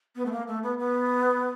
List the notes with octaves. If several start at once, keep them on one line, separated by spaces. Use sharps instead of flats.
B3
A3
A#3
A3
B3
B3